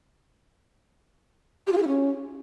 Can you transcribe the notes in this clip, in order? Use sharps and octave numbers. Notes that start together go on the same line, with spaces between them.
G4
F4
G#4
E4
C#4